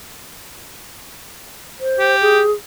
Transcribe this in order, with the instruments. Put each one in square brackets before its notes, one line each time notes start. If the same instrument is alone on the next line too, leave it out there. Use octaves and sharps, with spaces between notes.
[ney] C5
[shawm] G4
[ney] G#4